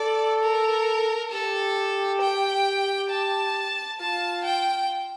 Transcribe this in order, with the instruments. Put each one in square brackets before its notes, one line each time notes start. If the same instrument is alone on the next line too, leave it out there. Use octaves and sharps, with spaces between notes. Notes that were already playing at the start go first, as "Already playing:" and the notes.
Already playing: [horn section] A4 [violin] D5
[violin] A#4
[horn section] G4 [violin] A4
[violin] G5
A5
[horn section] F4 [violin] A5
[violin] G5